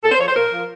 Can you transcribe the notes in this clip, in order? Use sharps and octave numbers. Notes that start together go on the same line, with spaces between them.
A#2 A4
C5
F3 C#5
C5
A#2 A#4
F3